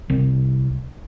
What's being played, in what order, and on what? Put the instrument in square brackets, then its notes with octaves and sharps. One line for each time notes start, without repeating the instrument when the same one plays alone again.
[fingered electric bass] C2